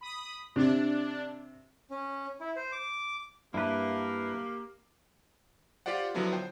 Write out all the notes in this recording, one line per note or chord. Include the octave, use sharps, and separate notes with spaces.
B5 D#6
C3 D4
C#4
E4
C5
D6
G2 A#3 E4 G4 B4 E5
F4 G4 C5 D5 F#5
D3 F3 F#3 B3 D4 E4
C5 G5